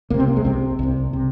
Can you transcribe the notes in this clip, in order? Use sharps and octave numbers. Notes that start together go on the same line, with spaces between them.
C2 C3 A#3
C4
A#3
G#3
C2 C3 C4
C2 C3
C3